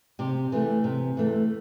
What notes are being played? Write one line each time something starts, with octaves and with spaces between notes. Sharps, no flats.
C3 G4
E3 A3
C3
E3 A3